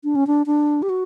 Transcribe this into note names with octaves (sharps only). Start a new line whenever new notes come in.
D4
C#4
D4
D4
G4
F#4